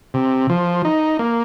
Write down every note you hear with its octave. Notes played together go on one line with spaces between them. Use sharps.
C3
F3
D#4
A#3